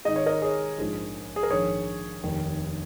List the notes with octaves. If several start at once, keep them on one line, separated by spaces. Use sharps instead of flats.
G#1 G#2 G#3 D#5
C#5
A#4 D#5
G#4 C#5
A#1 G#2 F3 G#3
G#4
A#4
A#1 G#2 D#3 G#4 C#5
F1 D#2 D#3